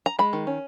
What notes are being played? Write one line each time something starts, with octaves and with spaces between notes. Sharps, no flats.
A#5
G#3 B5
D#3
C#4